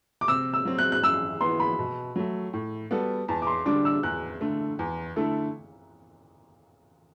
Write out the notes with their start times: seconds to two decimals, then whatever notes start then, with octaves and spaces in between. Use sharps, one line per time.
0.21 D6
0.28 C3 E6
0.54 E6
0.65 F#3 C4
0.79 F#6
0.92 F#6
1.03 F#2 E6
1.41 E3 B3 C6
1.60 B5
1.79 B2
2.16 F#3 A3
2.53 A2
2.91 G3 B3 F#4 A4
3.28 E2 A5
3.42 D6
3.47 C6
3.66 D3 G3 D4 D6
3.85 E6
4.03 E2 F#6
4.41 D3 A3
4.79 E2
5.16 D3 A3 E4 A4